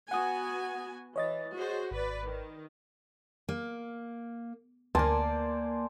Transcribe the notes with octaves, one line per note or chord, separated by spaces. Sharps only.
B3 F#4 F#5 G#5 D#6
E3 C#5 D#5 A6
F#4 G#4 C5
G#1 B4 D5
D#3
A#3
D2 A#3 A#4 C5 D5 G#5 A5